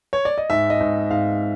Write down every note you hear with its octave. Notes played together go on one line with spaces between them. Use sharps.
C#5
D5
D#5
G#2 E5
D#5
G#2
G#2 F5